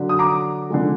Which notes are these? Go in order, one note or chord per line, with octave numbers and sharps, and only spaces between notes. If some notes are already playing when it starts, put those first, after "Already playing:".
Already playing: D3 F#3
D#6
A#5 D6
D3 F3 G#3